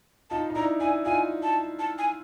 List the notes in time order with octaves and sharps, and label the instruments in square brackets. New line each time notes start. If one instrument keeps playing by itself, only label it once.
[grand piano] D#4 F4 [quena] A5
[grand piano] D#4
[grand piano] D4 E4 [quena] A#5
[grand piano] D4 E4 [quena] G#5
[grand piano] D#4 F4 [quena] G#5
[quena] A5
A5
G#5